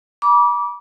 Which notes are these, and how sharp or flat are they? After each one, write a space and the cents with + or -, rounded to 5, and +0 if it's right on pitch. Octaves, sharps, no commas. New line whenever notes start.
B5 -40 D6 -15